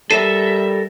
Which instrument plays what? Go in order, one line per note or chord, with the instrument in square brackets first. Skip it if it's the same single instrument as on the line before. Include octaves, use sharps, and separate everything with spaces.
[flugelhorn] G3 [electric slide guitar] A4 A#4 [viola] E5 [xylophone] C7 D#7 E7